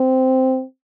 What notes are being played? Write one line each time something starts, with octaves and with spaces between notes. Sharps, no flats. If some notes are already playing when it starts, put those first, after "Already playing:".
Already playing: C4